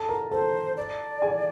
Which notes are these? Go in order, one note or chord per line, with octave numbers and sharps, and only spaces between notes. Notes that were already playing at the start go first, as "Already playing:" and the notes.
Already playing: A4 A5
A#4 A#5
A4 C5 A5
D5
G#4 G#5